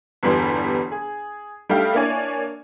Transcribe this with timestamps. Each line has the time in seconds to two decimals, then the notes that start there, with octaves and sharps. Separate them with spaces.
0.23 G1 E2 G3 B3 G#4 C6
0.92 G#4
1.69 G3 A3 D4 D#4 F5 G5
1.94 A#3 D4 E4 C#5 D5 G#5